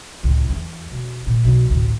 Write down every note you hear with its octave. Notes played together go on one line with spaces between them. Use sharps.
C#2 A2
E2
E1
A#2
B1
A1 D2